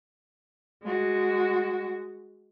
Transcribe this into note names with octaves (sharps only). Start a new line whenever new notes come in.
G#3 F#4